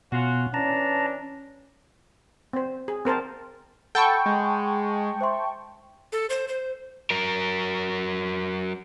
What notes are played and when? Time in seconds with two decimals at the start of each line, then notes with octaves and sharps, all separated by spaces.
0.12 B2 C#4 F4 F#4
0.54 E3 C#4 D4 A5 A#5
2.53 C4 C5
2.88 G#4
3.05 C4 A#4 C5 A5
3.95 A4 F#5 G5 A5 B5 C#6 G6
4.26 G#3
5.21 C5 E5 C6
6.12 A4
6.30 C5
6.48 C5
7.11 F#3 A#4